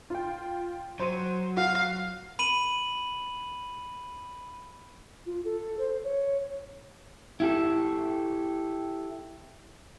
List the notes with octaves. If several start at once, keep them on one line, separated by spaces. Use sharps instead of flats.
F4 G5
F#3 C5 D#7
F#4 F5
B5 D#7 F#7
F4
A4
C5
C#5
E4 G4 A4